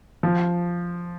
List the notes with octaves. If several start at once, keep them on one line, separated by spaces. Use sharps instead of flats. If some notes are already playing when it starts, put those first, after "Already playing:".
F3